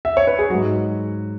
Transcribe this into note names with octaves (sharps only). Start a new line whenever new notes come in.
E5
C#5
B4
G#4
G#2 F#3 F#4